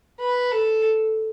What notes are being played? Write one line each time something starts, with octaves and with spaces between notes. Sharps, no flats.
B4
A4